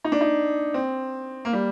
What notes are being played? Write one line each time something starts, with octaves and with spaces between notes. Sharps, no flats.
D#4
D4
D#4
C4
A#3
G3